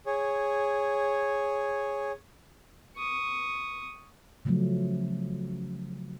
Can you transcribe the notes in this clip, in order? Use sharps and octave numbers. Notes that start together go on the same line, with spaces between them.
G#4 C#5
C#6 D#6
C#3 F3 F#3 A3 C#4